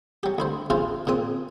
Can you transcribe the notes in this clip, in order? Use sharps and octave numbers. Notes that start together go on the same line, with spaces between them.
F#3 G4
D2 E4 C5
A#1 C#3 E4 F4 C5 A5
A#2 C#3 C4 D#6